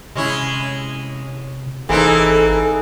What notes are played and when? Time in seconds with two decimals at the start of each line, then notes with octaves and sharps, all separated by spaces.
0.15 C3 G#3 C#4 E4
1.89 G#1 E3 A#3 C4 D#4 G#4 A4